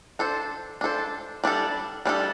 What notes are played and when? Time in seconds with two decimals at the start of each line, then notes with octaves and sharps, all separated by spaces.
0.19 D4 A4 C5
0.81 D4 A4 C5
1.44 G3 D4 A4
2.05 G3 D4 A4